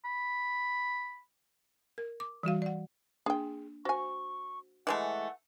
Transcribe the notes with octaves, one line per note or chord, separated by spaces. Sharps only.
B5
A#4
D6
E3 G3 F#4 F5
D5 F#5
A#3 D4 G#4 G5
F#4 C5 G#5 C#6
E3 G#3 A3 F#5